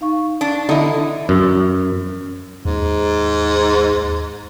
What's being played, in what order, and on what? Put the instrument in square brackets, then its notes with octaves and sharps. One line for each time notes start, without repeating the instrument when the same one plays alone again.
[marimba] D#4 F5 C#6
[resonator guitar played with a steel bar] D4
[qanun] D3 E4 [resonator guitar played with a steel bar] D#4
[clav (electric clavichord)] F#2
[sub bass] D#2 [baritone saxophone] G#2